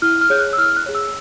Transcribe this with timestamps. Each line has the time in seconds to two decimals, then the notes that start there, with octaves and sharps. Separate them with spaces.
0.02 E4 F6
0.21 F6
0.30 G#4 C#5 G6
0.39 F#6
0.53 E6
0.58 E4 F6
0.76 F#6
0.86 G#4 C#5
0.95 E6